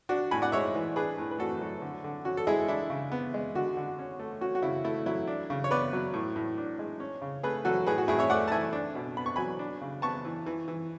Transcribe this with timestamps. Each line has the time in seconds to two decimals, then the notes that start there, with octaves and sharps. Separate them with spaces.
0.09 D4 F#4
0.31 A2 G#5 B5
0.42 D5 F#5
0.52 G#3 C#5 E5
0.75 E3
0.96 D4 G#4 B4
1.18 A2
1.31 B4
1.39 A3 F#4 A4
1.61 F#3
1.82 D3
2.04 D3
2.25 C#4 F#4
2.37 A4
2.47 G#3 E4 G#4
2.68 D4 E4
2.90 C#3
3.12 B3
3.34 G#3
3.55 D3 F#4
3.77 D3
3.99 C#4
4.19 A3
4.41 C#4 F#4
4.55 F#4
4.62 C#3 E4
4.84 A3 E4
5.06 F#3 E4
5.27 D4
5.50 C#3
5.64 C#5
5.71 B3 B4 D5
5.93 F#3
6.14 A2
6.36 A2
6.58 D4
6.79 G#3
7.00 C#4
7.22 C#3
7.43 A3 G#4 B4
7.65 F#3 F#4 A4
7.87 A2 G#4 B4
7.98 F#4
8.08 A2 E4 G#4
8.19 C#5 E5
8.30 A3 D5 F#5
8.48 A5
8.51 E3 E5 G#5
8.73 D4
8.95 B2
9.17 B3 B5
9.26 C#6
9.36 F#3 G#5 B5
9.59 D4
9.81 C#3
10.02 B3 A5 C#6
10.25 E3
10.46 E3
10.68 E3